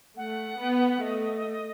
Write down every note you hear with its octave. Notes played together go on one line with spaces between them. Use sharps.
A3 F#5
B3
A3 D#5